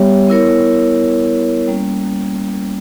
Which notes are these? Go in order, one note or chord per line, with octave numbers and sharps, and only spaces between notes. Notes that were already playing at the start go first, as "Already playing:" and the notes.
Already playing: G3 B3 G4 C#5 E5
B3 E4 A#4 C#5
G3 A#3 C#4